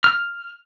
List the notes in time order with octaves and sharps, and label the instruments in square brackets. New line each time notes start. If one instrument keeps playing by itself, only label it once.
[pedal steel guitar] F6